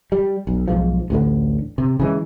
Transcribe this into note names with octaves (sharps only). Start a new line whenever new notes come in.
G3
B1
B1 G#2 F3
A1 D2 A2 D3
C3
C#3 E3 G#3